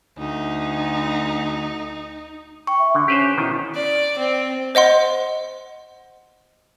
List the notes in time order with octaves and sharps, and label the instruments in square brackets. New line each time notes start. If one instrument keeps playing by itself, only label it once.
[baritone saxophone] D2 [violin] D#4
[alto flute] G5 [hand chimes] C#6
[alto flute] E5
[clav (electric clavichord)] D3 [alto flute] D4
[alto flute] C#4 [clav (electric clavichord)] G4 B4 C5
[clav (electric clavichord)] B2 D#3 [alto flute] E4
[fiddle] D5
C4
[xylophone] C5 D#5 F#5 C6